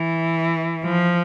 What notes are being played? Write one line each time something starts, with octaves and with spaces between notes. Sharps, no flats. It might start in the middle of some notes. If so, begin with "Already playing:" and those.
Already playing: E3
F3